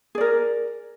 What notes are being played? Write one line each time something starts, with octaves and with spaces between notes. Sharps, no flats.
G#4 A#4 D5